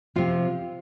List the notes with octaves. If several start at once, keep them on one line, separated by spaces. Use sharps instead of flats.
C3 F3 F4